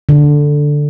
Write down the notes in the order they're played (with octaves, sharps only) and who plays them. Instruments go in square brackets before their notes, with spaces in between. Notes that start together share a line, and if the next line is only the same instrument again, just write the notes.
[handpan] D3